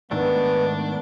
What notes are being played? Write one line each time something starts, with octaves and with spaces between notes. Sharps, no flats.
G#2 D#3 A3 B3 D4